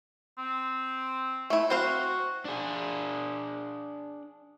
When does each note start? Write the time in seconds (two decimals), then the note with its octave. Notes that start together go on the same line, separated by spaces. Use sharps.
0.38 C4
1.50 A3 E4
1.70 C4 F#4 C5 F5
2.45 D4 G#4